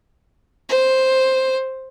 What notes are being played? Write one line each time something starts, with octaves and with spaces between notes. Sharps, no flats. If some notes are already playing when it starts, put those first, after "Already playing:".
C5